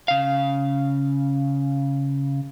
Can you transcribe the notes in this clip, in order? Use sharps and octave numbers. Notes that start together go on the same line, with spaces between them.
C#3 F5